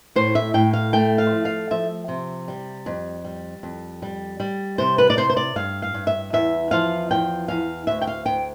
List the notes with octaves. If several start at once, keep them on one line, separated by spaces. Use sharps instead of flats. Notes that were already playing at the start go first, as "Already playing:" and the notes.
A2 C5
E5
A2 G5
F5
A3 G5
F5
F3
F5
F3 E5
C3
G3
F2
G3
F2
G3
G3
C3 C5
B4
D5
C3 C5
C5
D5
G2 F5
F5
G2
E5
E2 E5
F3 F5
E2 G5
E2 F5
D2 E5
G5
F5
D2 G5